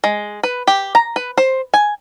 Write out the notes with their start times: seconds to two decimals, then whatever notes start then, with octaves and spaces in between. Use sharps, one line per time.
0.04 G#3
0.43 B4
0.67 G4
0.95 A#5
1.16 B4
1.37 C5
1.74 G#5